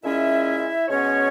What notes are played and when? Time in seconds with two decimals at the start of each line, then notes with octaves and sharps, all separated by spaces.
0.03 A#2 G#3 C#4 E4 E5
0.88 B2 G#3 B3 C#4 C#5